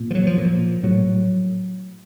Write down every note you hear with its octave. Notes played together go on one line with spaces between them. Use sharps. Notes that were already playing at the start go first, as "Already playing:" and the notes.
Already playing: A#2
F3
F#3
F3
A#2
A2 F#3